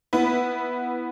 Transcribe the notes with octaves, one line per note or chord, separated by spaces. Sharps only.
B3 E4 B4